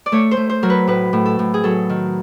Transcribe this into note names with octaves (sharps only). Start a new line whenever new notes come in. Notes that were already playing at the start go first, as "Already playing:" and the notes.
D5
A3 C#5
C5
A3
C5
F#3 A#4
B4
A2 B4
A2
A4
A2
G#4
F#3 A4
D#3